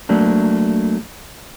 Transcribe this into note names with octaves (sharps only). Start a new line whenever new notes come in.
F#3 A3 A#3 D4